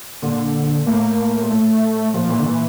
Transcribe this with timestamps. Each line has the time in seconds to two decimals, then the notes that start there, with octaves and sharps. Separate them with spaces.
0.22 A#2 D3
0.86 A2 A#3
1.41 A#2
1.50 A2 A3
2.14 A#2 F3
2.30 A#2 E3
2.39 D3
2.46 A#2 E3